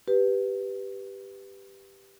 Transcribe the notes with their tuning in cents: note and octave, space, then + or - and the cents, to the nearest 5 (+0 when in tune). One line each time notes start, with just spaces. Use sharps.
G4 +0 B4 +0